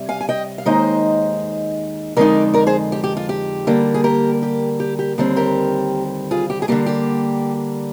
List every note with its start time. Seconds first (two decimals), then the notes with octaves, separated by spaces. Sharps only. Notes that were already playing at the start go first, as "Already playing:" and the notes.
Already playing: C3 G3
0.09 F5 G#5
0.21 G#5
0.29 D#5 G5
0.58 F5
0.66 D#2 D#3 G#3 D#4 C5 D#5
2.17 F2 D3 G#3 D#4 A#4 D5
2.54 A#4 D5
2.67 G#4 C5
2.92 G4
3.04 G4
3.17 F4
3.29 G4
3.67 D3 G3 A#3
3.94 G#4
4.04 G4 A#4
4.43 G4
4.80 G4
4.99 G4
5.18 D#2 D3 G3 C4
5.36 G4 A#4
6.31 F4 G#4
6.50 G4
6.62 G#4
6.68 D3 G3 A#3 G4
6.86 G4